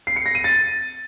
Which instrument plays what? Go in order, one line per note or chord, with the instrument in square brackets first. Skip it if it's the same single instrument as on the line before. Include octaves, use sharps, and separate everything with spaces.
[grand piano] C7
C#7
A#6
D#7
A6